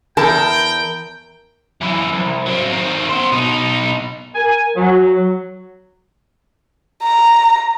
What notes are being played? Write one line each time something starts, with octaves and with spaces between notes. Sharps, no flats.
E2 A#4 G5 A5
F#2 E3
C2
F#3 C4
D#3 C4
B3 C5
B2 D#4
A#4 G#5
F#3
A#5